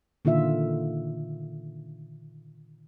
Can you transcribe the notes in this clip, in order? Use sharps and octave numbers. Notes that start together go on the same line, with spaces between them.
A#2 D3 D#3 F4 E5